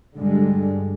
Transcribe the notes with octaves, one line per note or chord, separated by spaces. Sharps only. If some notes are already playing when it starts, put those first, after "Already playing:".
G2 D3 G3 G#3